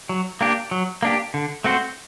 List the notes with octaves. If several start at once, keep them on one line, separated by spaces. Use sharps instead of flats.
F#3
A#3 D4 G4
F#3
A#3 D4 G4
D3
A3 C4 F#4 C5